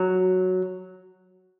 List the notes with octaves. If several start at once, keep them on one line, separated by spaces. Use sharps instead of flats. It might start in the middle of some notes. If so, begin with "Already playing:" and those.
Already playing: F#3